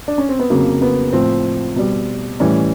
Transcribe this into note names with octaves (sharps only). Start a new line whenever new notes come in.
D4
C#4
C4
B3
F2 C#3 F#3 A#3
B3
A2 F3 C4
B2 G3
A2 E3 G3 C#4